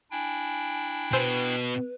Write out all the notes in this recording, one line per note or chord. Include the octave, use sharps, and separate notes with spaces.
D4 E4 G5 G#5
B2 B4 C5 G#5 E6